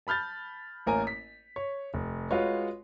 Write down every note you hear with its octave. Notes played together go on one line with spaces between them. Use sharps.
A5 B5 F6 G6 A6
A1 A#3 A#4 C#5 G#5
B6
C#5
F1
G#3 F4 F#4 B4 C#5 D#5